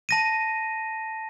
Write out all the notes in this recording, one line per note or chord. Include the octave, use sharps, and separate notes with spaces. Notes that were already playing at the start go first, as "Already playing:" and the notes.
A5 A#6 D#7